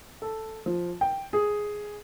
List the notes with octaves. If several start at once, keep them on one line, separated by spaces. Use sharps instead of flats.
A4
F3
G5
G#4